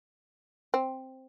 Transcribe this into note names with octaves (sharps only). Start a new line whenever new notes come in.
C4